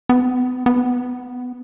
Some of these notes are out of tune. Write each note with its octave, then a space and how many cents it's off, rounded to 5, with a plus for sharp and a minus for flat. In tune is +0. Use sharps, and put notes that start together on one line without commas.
B3 +35
B3 +15